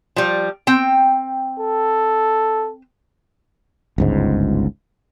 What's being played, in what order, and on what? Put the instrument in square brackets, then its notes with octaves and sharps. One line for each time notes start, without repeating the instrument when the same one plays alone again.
[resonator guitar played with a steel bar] F3 G3
C4 G5
[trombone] A4
[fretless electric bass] G1 C#2 G#2